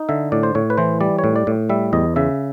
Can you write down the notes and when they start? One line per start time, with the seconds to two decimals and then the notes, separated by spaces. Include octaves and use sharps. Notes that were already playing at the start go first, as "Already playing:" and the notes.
Already playing: D#4
0.09 D3 E5
0.32 A2 D5
0.43 C5
0.55 A2 C#5
0.70 B4
0.77 E3 C5
1.01 G3 D5
1.19 C#5
1.24 A2
1.36 D5
1.47 A2
1.70 G3 E5
1.93 E2 D#5
2.16 C#3 E5